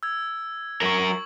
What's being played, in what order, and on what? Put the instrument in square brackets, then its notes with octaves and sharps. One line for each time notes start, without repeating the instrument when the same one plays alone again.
[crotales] E6 G#6
[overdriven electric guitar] F#3 A#4 [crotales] C#6 F#7